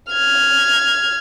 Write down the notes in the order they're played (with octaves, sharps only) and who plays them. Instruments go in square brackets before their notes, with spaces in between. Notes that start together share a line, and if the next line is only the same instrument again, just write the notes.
[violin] F6 G#6